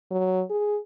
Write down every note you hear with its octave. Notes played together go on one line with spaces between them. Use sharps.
F#3
G#4